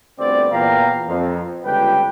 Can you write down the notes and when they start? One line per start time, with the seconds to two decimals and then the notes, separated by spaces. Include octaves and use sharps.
0.18 G1 D2 B3 C4 D5
0.51 E2 A#2 B3 F5 G5 A#5
1.08 F2
1.64 G1 C#2 G4 B4 G5